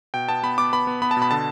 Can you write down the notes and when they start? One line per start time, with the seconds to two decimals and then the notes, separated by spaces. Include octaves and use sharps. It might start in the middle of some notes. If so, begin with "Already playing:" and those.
0.14 B2 G5
0.29 B3 A5
0.43 B3 B5
0.58 B3 D6
0.73 B3 B5
0.87 B3
1.02 B3 B5
1.11 A5
1.17 B2
1.22 B5
1.31 D3 A5